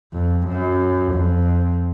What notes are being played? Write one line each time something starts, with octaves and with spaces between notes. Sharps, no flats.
F2
F#2
F2